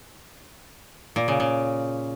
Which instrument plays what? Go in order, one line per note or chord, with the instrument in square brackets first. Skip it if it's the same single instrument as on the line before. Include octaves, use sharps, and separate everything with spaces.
[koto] A#2
C#3
C#3